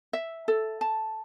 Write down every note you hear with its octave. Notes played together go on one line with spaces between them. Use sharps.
E5
A4
A5